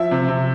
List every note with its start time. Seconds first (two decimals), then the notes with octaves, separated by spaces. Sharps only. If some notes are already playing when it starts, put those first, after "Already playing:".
Already playing: F3 E5
0.11 C3
0.28 C3